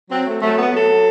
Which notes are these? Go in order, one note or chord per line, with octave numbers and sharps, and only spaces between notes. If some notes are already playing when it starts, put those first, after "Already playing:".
F#3 C4
A3
F#3 A3
B3
F#3 A4